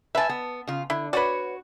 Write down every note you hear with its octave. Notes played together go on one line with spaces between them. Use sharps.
B4 E5 G#5 A5
B3
C#3 F4
D3 E4
F#4 B4 C#5 D5